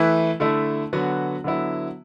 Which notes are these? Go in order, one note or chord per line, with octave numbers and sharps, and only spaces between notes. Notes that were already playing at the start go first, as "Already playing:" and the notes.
Already playing: E3 A3 E4 B4
D3 A3 E4
D3 F#3 B3 F#4
D3 F#3 B3 E4